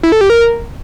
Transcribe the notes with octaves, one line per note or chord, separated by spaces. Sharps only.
E4
A4
G4
A#4